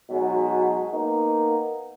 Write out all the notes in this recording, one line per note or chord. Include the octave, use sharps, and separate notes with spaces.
B2 F#3 G#3 D#4
A#3 B3 D#4